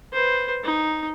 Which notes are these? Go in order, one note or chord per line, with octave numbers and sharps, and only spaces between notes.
B4 C5
D#4